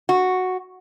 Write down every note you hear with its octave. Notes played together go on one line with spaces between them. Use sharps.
F#4